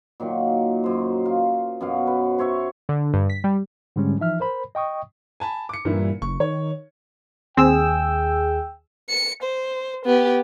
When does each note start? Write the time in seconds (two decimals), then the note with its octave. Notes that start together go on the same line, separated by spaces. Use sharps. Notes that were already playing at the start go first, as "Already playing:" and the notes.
0.20 A#2 D#3 F#3 A#3
0.84 F#2 C5
1.26 F4
1.81 F#2 B2 F#3 F5
2.07 B4
2.38 C5 C#5 E5 C#6
2.89 D3
3.14 G2
3.30 B6
3.44 G3
3.96 G#2 D3 G3 G#3 C#4
4.18 E3 F3 D#4 E5 F6
4.40 A#4 C5 B5
4.75 D#5 G5 C#6 D#6
5.40 G#5 A5 B5
5.69 D6 C#7
5.85 G2 A#2 E3 E4
6.22 F#1 C#6
6.40 D#3 C#5
7.57 D#2 C4 G#4 G5 E6
9.09 C#7
9.43 C5
10.05 B3 G4